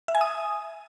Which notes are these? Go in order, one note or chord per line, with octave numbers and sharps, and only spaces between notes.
E5
G#5
D#6